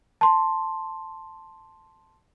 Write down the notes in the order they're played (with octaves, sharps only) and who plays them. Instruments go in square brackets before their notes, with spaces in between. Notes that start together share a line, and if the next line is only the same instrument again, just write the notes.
[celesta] A5 C6